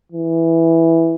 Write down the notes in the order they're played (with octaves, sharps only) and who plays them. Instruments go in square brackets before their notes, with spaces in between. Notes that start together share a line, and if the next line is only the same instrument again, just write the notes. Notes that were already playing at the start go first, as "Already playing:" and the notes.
[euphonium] E3